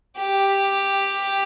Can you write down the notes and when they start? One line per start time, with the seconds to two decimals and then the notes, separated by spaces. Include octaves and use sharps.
0.18 G4